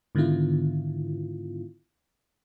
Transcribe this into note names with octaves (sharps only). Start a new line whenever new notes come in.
G#2 D3 D#3 B3 E4 F4